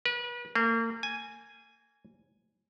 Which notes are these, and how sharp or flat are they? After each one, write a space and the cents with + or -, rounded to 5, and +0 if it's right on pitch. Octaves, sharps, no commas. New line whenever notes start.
B4 -35
A#3 -35
G#5 +0